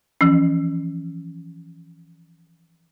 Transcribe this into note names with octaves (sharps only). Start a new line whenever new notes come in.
E3 F3 C#4